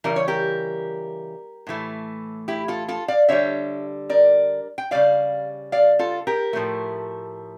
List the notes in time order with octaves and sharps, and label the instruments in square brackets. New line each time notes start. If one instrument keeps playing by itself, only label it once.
[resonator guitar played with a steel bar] C#3 E3 G3 A#4
C#5
G4 A#4
A2 E3 A3
E4 G4
F4 A4
F4 A4
D5 F5
D3 G3 C#5 E5
A#4 D5
G5
C#3 G3 D5 F5
D5 F5
F4 A4
G4 A#4
A2 F3 A3